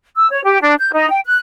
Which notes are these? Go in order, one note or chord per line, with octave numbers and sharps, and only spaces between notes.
E6
C#5
G4
D4
G6
D#4
G5
F#6